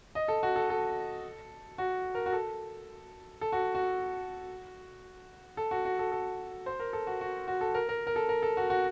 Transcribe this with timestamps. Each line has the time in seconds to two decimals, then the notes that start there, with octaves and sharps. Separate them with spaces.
0.15 D#5
0.28 A4
0.43 F#4
0.56 A4
0.70 A4
1.78 F#4
2.15 A#4
2.26 F#4
2.33 A4
3.41 A4
3.52 F#4
3.75 F#4
5.57 A4
5.71 F#4
5.85 F#4
5.99 A4
6.12 A4
6.66 C5
6.80 A#4
6.93 A4
7.07 F#4
7.21 F#4
7.48 F#4
7.61 A4
7.74 A#4
7.89 A#4
8.07 A#4
8.16 A4
8.29 A#4
8.42 A4
8.57 F#4
8.70 F#4